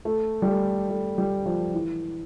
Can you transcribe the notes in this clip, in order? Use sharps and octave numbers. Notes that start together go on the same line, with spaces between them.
A3
G3
A3
A3
G3
F3
E3